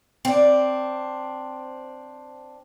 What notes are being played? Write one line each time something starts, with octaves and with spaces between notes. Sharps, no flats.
C4 D4